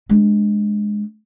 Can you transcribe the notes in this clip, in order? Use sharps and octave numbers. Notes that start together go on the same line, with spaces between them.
G#3 D4